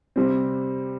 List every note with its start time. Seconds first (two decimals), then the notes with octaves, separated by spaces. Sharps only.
0.16 C3 G3 C4